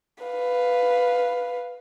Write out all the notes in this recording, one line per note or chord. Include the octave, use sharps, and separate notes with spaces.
B4 F5